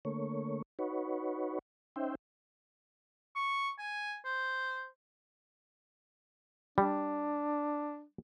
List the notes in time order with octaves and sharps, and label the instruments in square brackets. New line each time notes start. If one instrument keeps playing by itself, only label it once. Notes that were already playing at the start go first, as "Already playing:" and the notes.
[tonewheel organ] D3 A3 A#3 C#5
D#4 F#4 B4 C#5
C#4 D#4 C5 E5 G5
[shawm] C#6
G#5
C5
[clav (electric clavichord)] G3 [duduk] D4